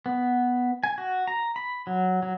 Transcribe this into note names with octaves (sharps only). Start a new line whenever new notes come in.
B3
G#5
F#4
A#5
B5
F#3
F#3